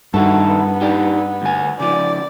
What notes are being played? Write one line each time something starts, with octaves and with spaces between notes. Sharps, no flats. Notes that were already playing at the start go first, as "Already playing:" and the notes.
G2 D#3 E4 F#4 A4
B3
D#4 G4 D5
D2 G#5
C#3 F3 D5 D6